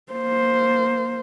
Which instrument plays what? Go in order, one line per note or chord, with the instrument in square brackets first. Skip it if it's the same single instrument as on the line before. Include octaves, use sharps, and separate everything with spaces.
[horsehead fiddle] A#3 C5